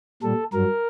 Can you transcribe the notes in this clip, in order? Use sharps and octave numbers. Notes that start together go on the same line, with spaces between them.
A#2 G3 A4
G2 F#3 A#4